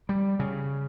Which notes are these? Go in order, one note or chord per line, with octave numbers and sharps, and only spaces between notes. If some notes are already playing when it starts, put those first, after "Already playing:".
G3
C#3